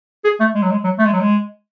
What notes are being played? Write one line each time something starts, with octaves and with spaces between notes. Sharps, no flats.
G#4
A3
G#3
F#3
G#3
F#3
A3
G#3
F#3
G#3